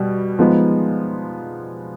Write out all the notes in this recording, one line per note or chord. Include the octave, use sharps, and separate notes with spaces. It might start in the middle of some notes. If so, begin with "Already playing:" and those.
Already playing: B2 G3
F3 G#3 B3 D#4